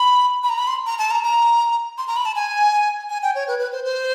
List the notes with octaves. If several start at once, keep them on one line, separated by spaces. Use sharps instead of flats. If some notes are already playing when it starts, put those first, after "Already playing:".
Already playing: B5
B5
A#5
B5
C6
A#5
A5
A#5
A#5
C6
A#5
B5
A5
G#5
G#5
G5
C#5
B4
B4
C5
C5